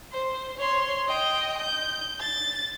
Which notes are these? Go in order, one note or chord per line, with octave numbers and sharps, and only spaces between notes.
C5
C#5 C6
D#5 G5
G6
A6